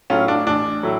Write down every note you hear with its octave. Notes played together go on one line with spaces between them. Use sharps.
A2 F#3 A3 C#4 F4
D4
A1 D4
A2 F#3 A3